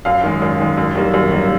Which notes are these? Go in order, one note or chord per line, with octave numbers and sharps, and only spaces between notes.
F#2 F5
D#3 G#3
F#2
D#3 G#3
F#2
D#3 G3 A#3
F#2
D#3 G3 A#3